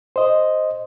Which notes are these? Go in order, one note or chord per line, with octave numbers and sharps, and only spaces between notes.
C5 D#5